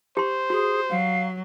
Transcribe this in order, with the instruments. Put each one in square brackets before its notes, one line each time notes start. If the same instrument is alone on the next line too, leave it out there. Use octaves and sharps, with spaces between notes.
[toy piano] G4 C6 [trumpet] C5
[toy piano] F#4 [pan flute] G#4
[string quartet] F#3 [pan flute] F5